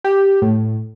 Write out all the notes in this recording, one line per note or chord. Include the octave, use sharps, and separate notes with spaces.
G4
A2